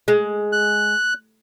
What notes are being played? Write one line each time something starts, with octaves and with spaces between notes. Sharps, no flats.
G#3
F#6